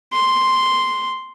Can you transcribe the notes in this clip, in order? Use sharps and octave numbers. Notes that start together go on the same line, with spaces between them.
C6